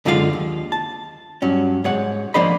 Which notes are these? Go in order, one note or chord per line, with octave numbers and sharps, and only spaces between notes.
F#2 D3 G#3 F4 G#4 F5
D#2
A5
G2 F#3 C#4
G#2 C#5 F#5
F3 A#3 D4 C5 D#5 B5